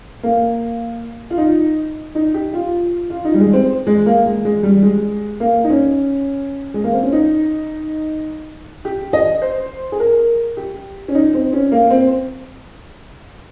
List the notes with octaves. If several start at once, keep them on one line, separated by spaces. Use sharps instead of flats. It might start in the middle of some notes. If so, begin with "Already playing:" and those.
A#3
F4
D#4
D#4
G4
F4
F4
D#4
G3
G#3
C4
G#3
A#3
G#3
G#3
G3
G#3
A#3
D#4
C#4
G#3
A#3
C4
C#4
D#4
G4
D#5
C5
G#4
A#4
G4
C#4
D#4
C4
C#4
A#3
C4